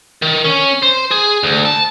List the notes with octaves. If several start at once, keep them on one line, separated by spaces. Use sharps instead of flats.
D#3
C#4
C5
G#4
D2
A5